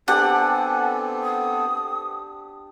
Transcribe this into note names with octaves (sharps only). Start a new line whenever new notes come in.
B3 C4 D4 G4 A4 D5 F#5 G#5
D#6